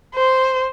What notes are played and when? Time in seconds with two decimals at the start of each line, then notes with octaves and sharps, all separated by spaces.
0.15 C5